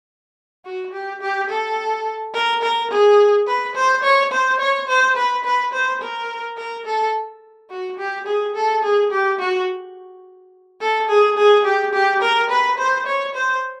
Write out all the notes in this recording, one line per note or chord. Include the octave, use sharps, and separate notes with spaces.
F#4
G4
G4
A4
A#4
A#4
G#4
B4
C5
C#5
C5
C#5
C5
B4
B4
C5
A#4
A#4
A4
F#4
G4
G#4
A4
G#4
G4
F#4
A4
G#4
G#4
G4
G4
A#4
B4
C5
C#5
C5